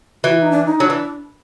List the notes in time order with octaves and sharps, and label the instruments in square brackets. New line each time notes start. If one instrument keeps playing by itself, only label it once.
[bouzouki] E3 [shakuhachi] F#4
[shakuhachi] E4
D#4
D4
D#4
[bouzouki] F#3 [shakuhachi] D4
[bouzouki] E3